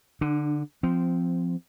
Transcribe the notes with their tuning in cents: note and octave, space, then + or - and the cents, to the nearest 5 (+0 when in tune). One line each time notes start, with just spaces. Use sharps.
D3 +0 D4 +35
F3 -5 C4 -15